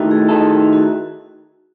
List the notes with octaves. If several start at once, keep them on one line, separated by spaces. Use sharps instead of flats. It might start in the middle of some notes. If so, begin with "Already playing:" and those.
Already playing: D#3 A3 D#4 E4 F#4
G#4
D#3 A3 D#4 A4
F#4